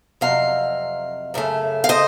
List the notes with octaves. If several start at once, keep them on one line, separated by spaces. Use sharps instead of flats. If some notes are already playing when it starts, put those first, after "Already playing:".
F2 C3 F#3 F5
F#2 C#3 A3
F5
C5 D#5